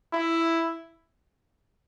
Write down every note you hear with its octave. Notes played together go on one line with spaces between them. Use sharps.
E4